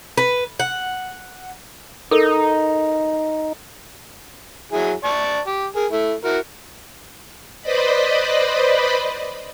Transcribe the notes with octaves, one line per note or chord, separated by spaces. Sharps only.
B4
F#5
D#4 A4 A#4
F#3 E4 G#4
D5 A5 C#6
G4
G#4 A#4
A3 E4
E4 F#4 A#4
B4 C5 D5 D#5 B5